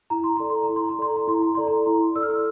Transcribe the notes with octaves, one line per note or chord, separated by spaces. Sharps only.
E4 A#5
C6
A4 D5 A#5
C6
A#5
E4
C6
A#5
A4 D5 C6
A#5
E4 C6
A#5
A4 D5 C6
A#5
E4 C6
A4 D5 E6
F6
E6